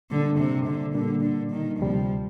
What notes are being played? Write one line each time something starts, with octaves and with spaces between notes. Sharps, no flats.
A#2 D3 G3 A#3 D4
C3
D3
A#2 D3 G3 A#3 D4
D3
D#3
D2 C3 F3 G3